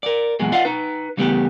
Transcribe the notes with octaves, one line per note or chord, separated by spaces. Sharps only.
A#4 D5
E2 A#2 E3 F#3 G#3
F4 D5 D#5 F5 F#5
D#4 B4
C#3 E3 G3 A3 B3 G4